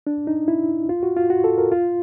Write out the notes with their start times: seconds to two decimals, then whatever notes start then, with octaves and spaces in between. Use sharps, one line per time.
0.07 D4
0.27 D#4
0.48 E4
0.89 F4
1.03 F#4
1.17 F4
1.30 F#4
1.44 A4
1.58 A#4
1.72 F4